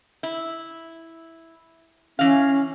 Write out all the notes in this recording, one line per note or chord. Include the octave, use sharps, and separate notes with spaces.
E4
E3 C#4 F5